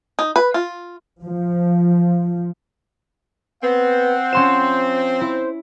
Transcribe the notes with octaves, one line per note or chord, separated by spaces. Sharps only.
D#4
B4
F4
F3
B3 C4 F#5
F3 C#4 C6 E7
E4 C5